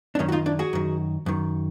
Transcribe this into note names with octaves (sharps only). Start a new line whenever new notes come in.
D4
F#2 D#3 C#4 D#4
F#4
D#4 F4
D4 E4
F#4 G#4
F#2 D#3
F#2 D#3